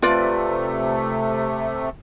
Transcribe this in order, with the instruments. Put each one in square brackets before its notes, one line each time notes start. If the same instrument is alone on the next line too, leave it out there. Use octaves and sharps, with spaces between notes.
[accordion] C3 A3 [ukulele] F4 B4 D5